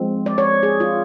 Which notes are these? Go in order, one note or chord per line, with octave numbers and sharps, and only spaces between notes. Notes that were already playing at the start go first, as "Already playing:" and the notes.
Already playing: F3 G#3 C4
D5
C#5
G#4
F4